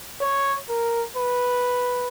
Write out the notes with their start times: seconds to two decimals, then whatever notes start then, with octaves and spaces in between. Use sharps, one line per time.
0.21 C#5
0.69 A#4
1.17 B4